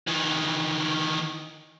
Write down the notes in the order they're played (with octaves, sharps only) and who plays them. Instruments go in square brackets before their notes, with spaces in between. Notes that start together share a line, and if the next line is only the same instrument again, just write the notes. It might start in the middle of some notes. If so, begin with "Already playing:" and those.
[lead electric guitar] D#3 E3